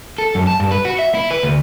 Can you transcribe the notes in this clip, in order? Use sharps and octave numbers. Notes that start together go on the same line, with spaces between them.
A4
F#2
A5
G2
B4
F#4
E5
E4
B4
D2